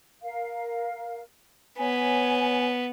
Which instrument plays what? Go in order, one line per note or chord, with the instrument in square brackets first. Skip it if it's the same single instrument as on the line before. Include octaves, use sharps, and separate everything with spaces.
[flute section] A#4 F5
[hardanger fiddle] B3 [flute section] C#5 G#5